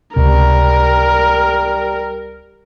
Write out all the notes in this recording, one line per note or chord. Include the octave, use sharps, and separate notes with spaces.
C#2 C3 G3 A#4